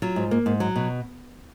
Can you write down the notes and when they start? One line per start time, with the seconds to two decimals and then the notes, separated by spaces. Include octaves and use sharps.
0.02 F#3 F4
0.16 G#2
0.31 A#3
0.46 G#2
0.60 F#3
0.76 B2